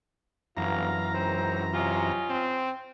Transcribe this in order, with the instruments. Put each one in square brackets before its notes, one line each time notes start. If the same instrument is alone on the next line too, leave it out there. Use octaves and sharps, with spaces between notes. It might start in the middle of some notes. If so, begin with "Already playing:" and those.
[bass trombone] G1 [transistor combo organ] F#2 E3 A#5 [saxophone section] B2 F4 F5
[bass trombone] C#2 [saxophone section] D#3 C4 C5
[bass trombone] C3 [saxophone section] C#4 D#4 F4
[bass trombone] C4